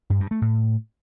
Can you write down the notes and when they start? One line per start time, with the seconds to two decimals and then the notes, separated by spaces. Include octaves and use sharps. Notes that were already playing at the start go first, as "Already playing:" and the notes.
0.10 G2
0.20 G2
0.31 A3
0.42 A2